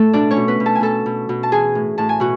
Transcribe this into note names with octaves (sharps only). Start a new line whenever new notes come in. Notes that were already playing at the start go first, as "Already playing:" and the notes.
Already playing: A2 A3 A4
B2 D4 D5
C#4 C#5
B2
B3 B4
B2
A4 A5
G#5
B2 A4 A5
B2
B2
A5
E3 G#4 G#5
A2
A2 A5
G#5
B2 F#4